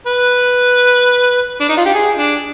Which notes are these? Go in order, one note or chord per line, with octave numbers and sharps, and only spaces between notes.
B4
D4
D#4
F4
G4
G#4
D4